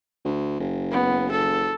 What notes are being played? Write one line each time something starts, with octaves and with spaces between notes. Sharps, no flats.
D2
F#1
B3
A4